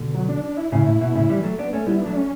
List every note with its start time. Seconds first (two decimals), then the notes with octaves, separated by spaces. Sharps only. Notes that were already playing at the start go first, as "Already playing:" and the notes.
Already playing: B2 D3
0.14 F#3
0.28 D4
0.44 D4
0.57 E4
0.72 A2 C#3 E4
0.86 A2
1.01 B2
1.15 A2 C#3
1.29 E3 G3
1.43 F#3 A3
1.59 B3 D4
1.73 A3 C#4
1.87 G3 B3 E4
2.01 F#3 A3 D4
2.16 C#4